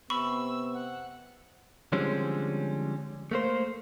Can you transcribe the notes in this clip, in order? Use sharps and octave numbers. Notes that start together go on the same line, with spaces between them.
C3 B3 B5 C#6 E6
F#5
D3 F3 G3 G#3 C4 C#4
A3 A#3 C5